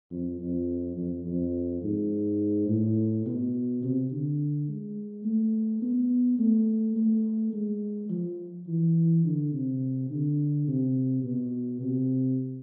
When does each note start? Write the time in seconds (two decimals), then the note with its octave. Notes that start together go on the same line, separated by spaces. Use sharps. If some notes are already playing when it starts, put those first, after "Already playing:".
0.11 F2
0.40 F2
0.97 F2
1.26 F2
1.83 G#2
2.68 A2
3.26 B2
3.82 C3
4.11 D3
4.68 G#3
5.25 A3
5.82 B3
6.39 A3
6.96 A3
7.53 G#3
8.10 F3
8.67 E3
9.25 D3
9.53 C3
10.10 D3
10.67 C3
11.24 B2
11.81 C3